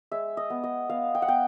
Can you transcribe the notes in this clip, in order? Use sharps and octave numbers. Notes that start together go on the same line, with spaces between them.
G#3 E5
D#5
B3
D#5
B3 F5
G5
F#5
B3 G5